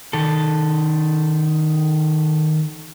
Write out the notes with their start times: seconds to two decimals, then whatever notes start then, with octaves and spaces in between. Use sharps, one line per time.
0.13 D#3 A4